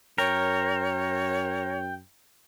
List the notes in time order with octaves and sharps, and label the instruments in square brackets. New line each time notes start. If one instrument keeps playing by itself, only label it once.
[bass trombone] F#2 [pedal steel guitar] A#4 [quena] C#5 [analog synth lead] G5